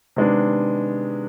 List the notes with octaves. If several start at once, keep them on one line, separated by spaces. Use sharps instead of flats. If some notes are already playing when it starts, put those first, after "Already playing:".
C3 D#3 G#3 B3 D4